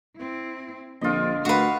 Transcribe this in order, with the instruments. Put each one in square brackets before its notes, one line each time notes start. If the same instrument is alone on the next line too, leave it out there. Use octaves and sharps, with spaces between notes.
[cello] C4 E4
[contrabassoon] A#1 [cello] D3 C4 [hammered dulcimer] F4 D#5
[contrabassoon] D2 [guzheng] F#4 B4 [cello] F5